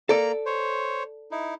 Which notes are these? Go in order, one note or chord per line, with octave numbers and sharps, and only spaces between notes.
A#3 A4 D5 A#5
C5 C#5
D#4 E4